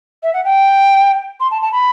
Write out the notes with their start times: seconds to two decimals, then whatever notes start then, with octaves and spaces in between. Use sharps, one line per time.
0.23 E5
0.34 F#5
0.44 G5
1.40 C6
1.51 A5
1.62 A5
1.72 B5